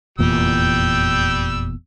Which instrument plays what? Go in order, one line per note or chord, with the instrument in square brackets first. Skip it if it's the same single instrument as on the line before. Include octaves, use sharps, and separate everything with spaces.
[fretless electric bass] F1 E2 A#2 [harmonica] G3 G5 E6